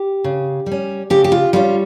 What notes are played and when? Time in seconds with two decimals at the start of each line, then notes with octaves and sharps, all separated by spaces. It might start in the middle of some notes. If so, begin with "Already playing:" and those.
Already playing: G4
0.24 C#3
0.66 G3
0.72 C#4
1.10 C#3 G4
1.24 G4
1.32 F4
1.53 G3 C#4 F4